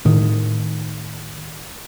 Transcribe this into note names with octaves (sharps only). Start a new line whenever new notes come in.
A2 D#3